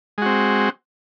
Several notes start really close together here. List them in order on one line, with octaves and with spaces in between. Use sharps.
G#3 F#4 C4